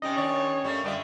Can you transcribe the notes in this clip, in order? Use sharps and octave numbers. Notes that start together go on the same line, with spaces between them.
C3 G3 C#4 D#4 D#5 G5
D#2 D4 C#5 D5
F#2 G3 A3 A#3
D3 G3 F4 G4 A#4 D#5 E5